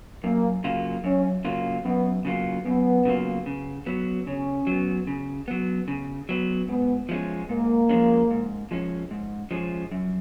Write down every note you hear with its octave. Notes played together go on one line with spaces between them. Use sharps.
F#2 A#3
C#3 F#3 A#3 F4
F#2 C#4
C#3 F#3 A#3 F4
F#2 B3
C#3 F#3 A#3 F4
F#2 B3
C#3 F#3 A#3 F4
C#3
F#3 B3
C#3 C#4
F#3 B3
C#3
F#3 B3
C#3
F#3 B3
G#2 B3
F3 G#3 C#4
G#2 A#3
F3 G#3 C#4
G#2
F3 G#3 C#4
G#2
F3 G#3 C#4
F#2